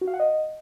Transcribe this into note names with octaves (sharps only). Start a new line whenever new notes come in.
F#4
F5
F#5
D#5